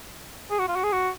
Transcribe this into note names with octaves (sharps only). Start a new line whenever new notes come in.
G#4
F#4
F4
F#4
G#4
F#4